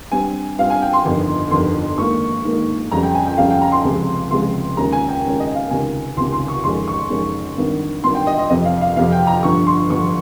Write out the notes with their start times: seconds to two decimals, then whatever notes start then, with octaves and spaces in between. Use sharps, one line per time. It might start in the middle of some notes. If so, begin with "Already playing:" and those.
0.12 G2 G3 C4 G#5
0.59 G2 G3 C4 F5
0.70 G#5
0.82 G5
0.93 C6
1.05 G1 F2 D#3
1.51 G1 F2 D#3 C6
1.98 G#2 D#3 A#3 C#6
2.45 G#2 D#3 A#3
2.91 F2 C#3 G3 C#4 A#5
3.03 G5
3.15 G#5
3.26 G5
3.38 F2 C#3 G3 C#4 F5
3.50 G5
3.61 A#5
3.72 C6
3.84 C#2 C3 F3 G#3 C4
4.31 C#2 C3 F3 G#3 C4 C6
4.77 D#2 C#3 G#3 C#4 A#5
4.92 G#5
5.09 G5
5.24 D#2 C#3 G#3 C#4
5.40 D#5
5.55 F5
5.71 C#2 C3 D#3 G#5
6.17 C#2 C3 D#3 C6
6.32 C6
6.48 C#6
6.64 F2 D#3 G#3 C#4 C6
6.88 C#6
7.10 F2 D#3 G#3 C#4
7.57 G#1 G2 D#3
8.04 G#1 G2 D#3 C6
8.15 G5
8.27 D#5
8.39 D#5
8.50 F2 C3 F3 C4 D#5
8.65 F5
8.81 F5
8.96 F2 C3 F3 C4 F5
9.12 G5
9.27 A#5
9.43 G1 G2 F3 C#6
9.67 C6
9.90 G1 G2 F3 C#6